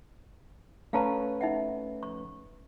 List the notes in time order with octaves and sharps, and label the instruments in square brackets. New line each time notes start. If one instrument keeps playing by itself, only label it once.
[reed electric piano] A3 C#4 B4 [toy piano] F5 A5 A#5
[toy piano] D#4 E5 F#5
C#6